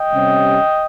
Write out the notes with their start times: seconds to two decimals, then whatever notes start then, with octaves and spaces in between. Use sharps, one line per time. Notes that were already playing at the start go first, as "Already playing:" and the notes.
Already playing: D#5 G5
0.10 C3 G3 C#4